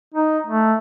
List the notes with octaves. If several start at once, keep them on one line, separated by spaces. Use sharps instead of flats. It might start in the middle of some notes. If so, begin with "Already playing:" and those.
D#4
A3